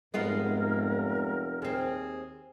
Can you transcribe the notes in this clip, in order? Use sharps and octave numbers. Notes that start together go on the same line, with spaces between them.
F1 G#2 G#3 B3 F4 A#4
D#2 C4 G#4